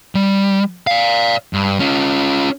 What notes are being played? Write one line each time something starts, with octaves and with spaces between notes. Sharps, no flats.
G3
D5 F5
G2
C#4 F4